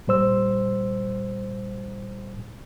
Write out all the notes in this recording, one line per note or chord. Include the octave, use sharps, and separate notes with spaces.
A#2 G3 C5 E6